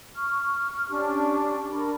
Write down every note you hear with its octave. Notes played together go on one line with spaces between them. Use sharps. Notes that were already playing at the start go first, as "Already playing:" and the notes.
C#6 F6
C#4 D4 G4 C#6
D4 A#4 B5